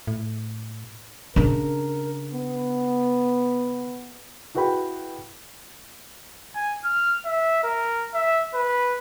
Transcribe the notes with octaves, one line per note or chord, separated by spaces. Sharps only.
A2
C#3 D4 A#4
B3
E4 F#4 G#4 B4 G5 B5
G#5
F6
E5
A#4
E5
B4